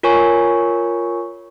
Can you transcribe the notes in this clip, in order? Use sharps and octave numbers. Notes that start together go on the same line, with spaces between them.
F4 A#4 C#5 G#5 C#6